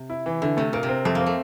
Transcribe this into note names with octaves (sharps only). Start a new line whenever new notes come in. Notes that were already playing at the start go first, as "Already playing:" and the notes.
Already playing: C3
E4
E3
D3 E4
C3 A3
A#2 A#4
C3
C4
F2 A3
A#3
C4
A3